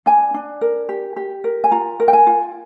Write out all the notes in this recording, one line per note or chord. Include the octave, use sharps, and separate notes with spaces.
D4 G#5
D4
A#4
G4
G4
A#4
G#5
F4 A#5
A#4
G5
G#5
F4